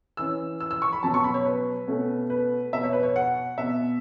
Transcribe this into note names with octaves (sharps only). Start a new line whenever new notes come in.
E3 C#4 E6
E6
E6
C#6
B5
B2 F#3 C#4 A5
C#6
B5
C#5
B4
B2 A3 C#4
B4
B2 B3 E5
C#5
B4
C#5
F#5
B2 B3 E5